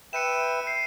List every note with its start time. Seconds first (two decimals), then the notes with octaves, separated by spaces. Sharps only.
0.13 B4 E5 G5 C#7 D#7 E7
0.67 C7